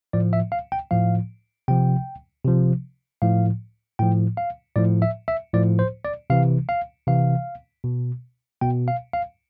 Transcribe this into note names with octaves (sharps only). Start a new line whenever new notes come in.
A2 F3 D5
E5
F5
G5
A2 F3 F5
C3 F3 G5
C3 F3
A2 F3 F5
A2 F3 G5
F5
A2 F3 D5
E5
E5
A2 F3 D5
C5
D5
C3 E3 F5
F5
C3 E3 F5
B2
B2 G5
F5
F5